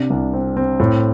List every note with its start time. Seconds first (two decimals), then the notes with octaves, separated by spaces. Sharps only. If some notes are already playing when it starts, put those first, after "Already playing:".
Already playing: C3 D4
0.10 C2
0.33 C4
0.57 C4
0.80 A2